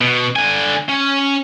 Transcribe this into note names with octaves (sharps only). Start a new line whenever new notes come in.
B2
D3 G#5
C#4